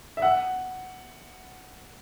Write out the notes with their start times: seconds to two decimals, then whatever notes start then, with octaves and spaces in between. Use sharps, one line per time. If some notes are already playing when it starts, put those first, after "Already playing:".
0.17 E5
0.22 F#5